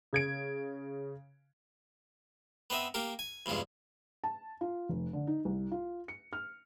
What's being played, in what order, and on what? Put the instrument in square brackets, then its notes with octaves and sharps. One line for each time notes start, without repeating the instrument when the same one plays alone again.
[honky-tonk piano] C#3 G#6 D7
[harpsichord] B3 C4 D#5 E5
A#3 G4 A#4
G#5
E2 G2 C3 F3 G#3
[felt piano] A5
F4
F1
D3
D#4
C2
F4
C#7
F6